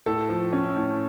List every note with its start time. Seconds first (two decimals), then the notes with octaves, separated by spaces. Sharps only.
0.06 A2 A4
0.29 F3
0.53 C#4
0.76 A2